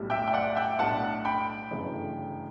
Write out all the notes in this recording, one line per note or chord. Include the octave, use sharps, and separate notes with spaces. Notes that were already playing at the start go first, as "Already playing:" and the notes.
Already playing: B1 A2 G3
E5 G5
G5
D5 F#5
E5 G5
B1 A2 G3 D4 F#5 A5
G5 B5
G1 F#2 C#3 E3 A3